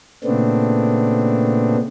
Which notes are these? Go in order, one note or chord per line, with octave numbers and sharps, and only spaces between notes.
A#2 C#3 A3 B3 C4 D4